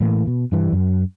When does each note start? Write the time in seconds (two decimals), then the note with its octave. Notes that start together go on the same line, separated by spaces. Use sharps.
0.01 A2 E3 A#3
0.27 B2
0.52 G2 E3 G3
0.72 F#2